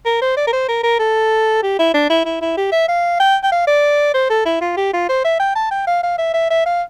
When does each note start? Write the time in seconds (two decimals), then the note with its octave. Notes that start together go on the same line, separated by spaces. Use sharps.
0.05 A#4
0.22 C5
0.37 D5
0.47 A#4
0.53 C5
0.69 A#4
0.84 A#4
0.99 A4
1.63 G4
1.79 E4
1.94 D4
2.10 E4
2.25 E4
2.42 E4
2.57 G4
2.72 E5
2.88 F5
3.20 G5
3.44 G5
3.52 F5
3.67 D5
4.14 C5
4.30 A4
4.46 E4
4.61 F4
4.77 G4
4.93 F4
5.09 C5
5.25 E5
5.40 G5
5.55 A5
5.71 G5
5.87 F5
6.03 F5
6.18 E5
6.34 E5
6.50 E5
6.66 F5